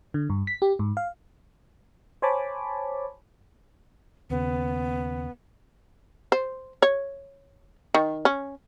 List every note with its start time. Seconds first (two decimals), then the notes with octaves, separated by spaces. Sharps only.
0.14 D3
0.30 G2
0.47 B6
0.62 G4
0.79 G#2
0.97 F5
2.22 C5 C#5 G#5 A5 B5 D6
4.30 D#2 C#3 B3
6.32 C5
6.82 C#5
7.94 D#3
8.25 C#4